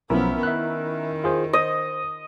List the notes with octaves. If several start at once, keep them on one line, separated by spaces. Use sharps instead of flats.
B1 F3 B3 C#4 E4 A#4
D#3 E5 F#6
F4 G#4 C5
C5 D#5